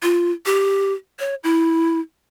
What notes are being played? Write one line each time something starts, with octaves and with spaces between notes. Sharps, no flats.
F4
G4
C#5
E4